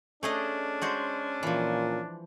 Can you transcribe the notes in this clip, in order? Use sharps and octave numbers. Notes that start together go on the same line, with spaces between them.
A3 C#4 D4 G#4 D#5
G#3 F#4 C5
A#2 E3 F3